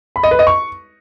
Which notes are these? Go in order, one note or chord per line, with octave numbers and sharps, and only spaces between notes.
B5
D#5
B4
D#5
C#6